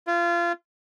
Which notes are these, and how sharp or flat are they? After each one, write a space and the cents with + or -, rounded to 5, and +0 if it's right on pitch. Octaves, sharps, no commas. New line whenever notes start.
F4 -25